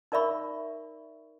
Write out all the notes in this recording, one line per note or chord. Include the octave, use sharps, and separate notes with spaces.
D#4 A#4 D5 E5 B5 C#6